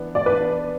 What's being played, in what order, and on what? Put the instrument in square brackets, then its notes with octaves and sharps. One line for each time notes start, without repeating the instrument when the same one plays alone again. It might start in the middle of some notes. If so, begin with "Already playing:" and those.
Already playing: [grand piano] E3 B3 D4
[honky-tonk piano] D5
[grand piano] E3 B3 D4 [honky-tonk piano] B4